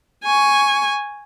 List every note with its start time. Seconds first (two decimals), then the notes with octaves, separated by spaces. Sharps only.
0.24 G#5 C#6